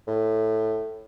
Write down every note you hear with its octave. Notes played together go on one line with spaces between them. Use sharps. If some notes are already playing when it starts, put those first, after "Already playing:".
A2